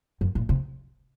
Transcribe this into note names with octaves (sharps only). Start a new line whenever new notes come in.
F#2
A#2
C3